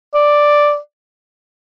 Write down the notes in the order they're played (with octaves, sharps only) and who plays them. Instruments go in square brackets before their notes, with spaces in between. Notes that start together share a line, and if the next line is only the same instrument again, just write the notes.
[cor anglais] D5